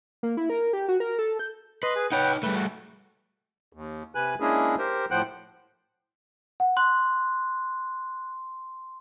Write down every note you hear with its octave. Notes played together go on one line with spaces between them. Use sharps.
A#3
E4
A#4
G4
F#4
A#4
A4
G6
B4 D#5 C6
G#4
D#4 B4 C#5 F#5 G5
G3 A3 B4
F#4
D#2
C3 B4 G#5 F#6
G#3 A#3 C#4 D4 E4 G#4
G4 A#4 C5
A2 F3 C5 F#5 G5 F#6
F#5
C6 F#6